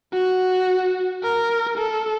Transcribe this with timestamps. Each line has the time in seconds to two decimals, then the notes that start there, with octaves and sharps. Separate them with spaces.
0.13 F#4
1.23 A#4
1.78 A4